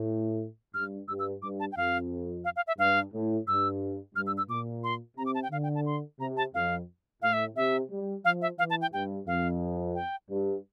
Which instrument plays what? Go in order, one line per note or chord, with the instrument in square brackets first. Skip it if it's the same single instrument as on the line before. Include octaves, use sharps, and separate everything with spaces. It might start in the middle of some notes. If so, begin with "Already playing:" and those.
Already playing: [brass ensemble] A2
[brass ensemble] G2 [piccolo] F6
[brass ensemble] G2 [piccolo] E6
[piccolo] E6
[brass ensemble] G2 [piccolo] D6
[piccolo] A5
G5
[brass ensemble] F2 [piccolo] F5
[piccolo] F5
F5
E5
[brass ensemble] G2 [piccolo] F5
[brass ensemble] A2
[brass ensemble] G2 [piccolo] E6
[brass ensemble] G2 [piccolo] F6
[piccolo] E6
E6
[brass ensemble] A#2 [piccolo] D6
[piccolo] C6
[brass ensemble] C3 [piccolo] A#5
[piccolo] D6
A5
G5
[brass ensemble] D3 [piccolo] F5
[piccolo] G5
A5
C6
[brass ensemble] C3 [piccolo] A#5
[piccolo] A5
[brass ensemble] F2 [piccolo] F5
[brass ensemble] A2 [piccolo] F5
[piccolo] E5
[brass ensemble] C3 [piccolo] E5
[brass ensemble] G3
[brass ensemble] F3 [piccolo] F5
[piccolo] E5
[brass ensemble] E3 [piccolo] F5
[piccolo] A5
G5
[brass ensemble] G2 [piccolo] G5
[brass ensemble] F2 [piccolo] F5
[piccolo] G5
[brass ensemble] G2